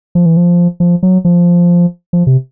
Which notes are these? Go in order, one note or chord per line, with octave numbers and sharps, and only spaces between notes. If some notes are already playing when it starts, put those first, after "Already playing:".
F3
E3
F3
F3
F#3
F3
F3
C3